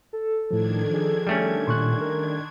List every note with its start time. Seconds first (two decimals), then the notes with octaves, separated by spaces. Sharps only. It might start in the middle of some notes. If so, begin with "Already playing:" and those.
0.13 A4
0.51 A2 D#3 F3 D4 G#6
0.90 F3 G#4
1.27 G3 A3 C#4
1.67 A#2 C6 C#6 F#6
2.01 A#4